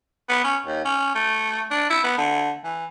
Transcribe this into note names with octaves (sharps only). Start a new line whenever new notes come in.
B3
C#4
D#2
C#4
A3
D4
E4
B3
D3
E3